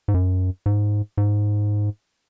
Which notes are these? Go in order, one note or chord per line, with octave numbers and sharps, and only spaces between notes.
G#2
F#2
G#2
G#2